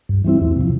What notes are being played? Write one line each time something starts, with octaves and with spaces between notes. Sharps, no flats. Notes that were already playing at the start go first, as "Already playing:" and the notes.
G2
E3 G3 C4 E4
E2
C3 F3